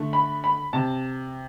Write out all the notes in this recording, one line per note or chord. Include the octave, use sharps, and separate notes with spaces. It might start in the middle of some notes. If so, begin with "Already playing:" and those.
Already playing: D3 A3
B5
B5
C3 A5